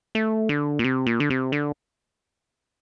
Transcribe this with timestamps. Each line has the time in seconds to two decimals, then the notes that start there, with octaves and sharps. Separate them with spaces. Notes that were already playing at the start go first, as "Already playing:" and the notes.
0.15 A3
0.49 D3
0.79 A#2
0.84 C3
1.06 A#2
1.20 D3
1.30 C3
1.52 D3